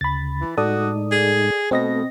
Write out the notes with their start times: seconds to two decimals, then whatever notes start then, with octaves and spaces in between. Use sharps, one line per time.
0.01 D2 C#3 B5 A6
0.41 E3
0.57 A2 G#3 D#4 F#4 A4 D5 D#6
1.12 G#4
1.71 B2 A3 C4 A4 D#5 A#6